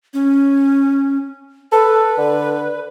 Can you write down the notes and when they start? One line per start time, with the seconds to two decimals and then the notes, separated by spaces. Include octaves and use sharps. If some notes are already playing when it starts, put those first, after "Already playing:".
0.14 C#4
1.72 A4 B4
2.18 D3